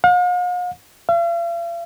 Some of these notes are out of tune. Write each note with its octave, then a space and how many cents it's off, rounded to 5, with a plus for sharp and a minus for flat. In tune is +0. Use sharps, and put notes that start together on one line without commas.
F5 +45
F5 -45